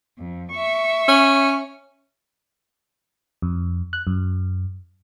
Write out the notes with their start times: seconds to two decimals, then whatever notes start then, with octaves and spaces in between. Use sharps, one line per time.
0.18 F2
0.51 E5 C#6
1.08 C#4
3.42 F2
3.93 F#6
4.07 F#2